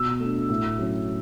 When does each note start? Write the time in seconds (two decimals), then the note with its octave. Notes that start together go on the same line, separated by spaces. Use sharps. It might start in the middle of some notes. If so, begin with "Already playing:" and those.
Already playing: B2 E6
0.20 A3 D4
0.49 A2
0.79 F#3 C#4